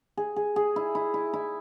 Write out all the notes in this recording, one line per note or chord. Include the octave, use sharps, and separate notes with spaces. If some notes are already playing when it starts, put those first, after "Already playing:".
G#4
G#4
G#4
E4
E4
E4
E4